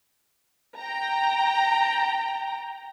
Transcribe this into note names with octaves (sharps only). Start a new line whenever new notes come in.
G5 A#5